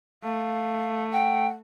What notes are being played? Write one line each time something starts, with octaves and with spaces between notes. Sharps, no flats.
A3 F5
F#5 G5